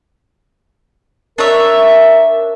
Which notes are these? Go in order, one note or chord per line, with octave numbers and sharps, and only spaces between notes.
D4 A#4 C#5 E5